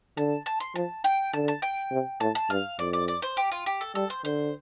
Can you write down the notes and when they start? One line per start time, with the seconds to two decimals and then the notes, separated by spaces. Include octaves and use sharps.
0.17 D3 A5
0.46 A5
0.60 C6
0.75 F3 A5
1.04 G5
1.33 D3 A5
1.48 A5
1.62 G5
1.91 C3
2.20 A2 A5
2.35 A5
2.50 G2 F5
2.79 F2 D5
2.93 D5
3.08 D5
3.22 C5
3.37 G4
3.52 F4
3.66 G4
3.81 A4
3.95 G3 A4
4.10 C5
4.25 D3 C5